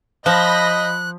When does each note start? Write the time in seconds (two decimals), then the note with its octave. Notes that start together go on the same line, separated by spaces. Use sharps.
0.26 F3 D#5 B5 F#6 G6 A#6